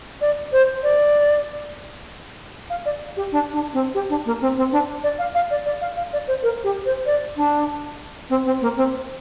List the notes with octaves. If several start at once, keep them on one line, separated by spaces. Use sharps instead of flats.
D5
C5
D5
F5
D5
G4
D4
D4
C4
G4
D4
A#3
C4
C4
D4
D5
F5
F5
D5
D5
F5
F5
D5
C5
A#4
G4
C5
D5
D4
C4
C4
A#3
C4